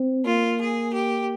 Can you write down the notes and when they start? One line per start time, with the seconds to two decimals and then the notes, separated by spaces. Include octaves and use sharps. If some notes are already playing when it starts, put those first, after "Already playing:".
Already playing: C4
0.25 A#3 F4
0.59 G#4
0.93 G4